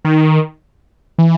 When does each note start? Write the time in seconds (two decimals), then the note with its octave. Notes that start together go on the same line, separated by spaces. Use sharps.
0.05 D#3
1.18 E3